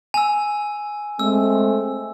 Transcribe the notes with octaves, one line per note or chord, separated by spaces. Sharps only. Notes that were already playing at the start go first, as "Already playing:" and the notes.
G#5 E6
G#3 A3 C4 E6